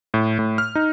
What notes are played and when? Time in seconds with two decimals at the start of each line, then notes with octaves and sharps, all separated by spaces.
0.14 A2
0.39 A2
0.58 F6
0.75 D#4